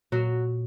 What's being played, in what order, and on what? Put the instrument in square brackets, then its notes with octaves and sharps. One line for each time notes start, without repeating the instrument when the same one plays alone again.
[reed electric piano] A#2 [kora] F#3 F#4